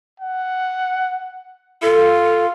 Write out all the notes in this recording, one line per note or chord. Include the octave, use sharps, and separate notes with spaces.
F#5
F4 A4